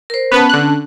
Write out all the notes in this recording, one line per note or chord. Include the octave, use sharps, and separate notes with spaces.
A#4 C5
B3 C#4 B4 A5
D3 F#6